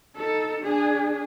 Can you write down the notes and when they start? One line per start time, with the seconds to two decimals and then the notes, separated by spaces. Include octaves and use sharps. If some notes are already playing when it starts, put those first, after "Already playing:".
0.15 D#4 A4
0.62 D4 G#4